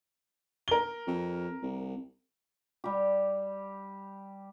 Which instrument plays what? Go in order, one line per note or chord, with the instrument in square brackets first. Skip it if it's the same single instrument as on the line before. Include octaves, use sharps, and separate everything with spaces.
[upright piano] A#4 G7
[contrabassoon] F2
C2
[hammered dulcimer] G3 G4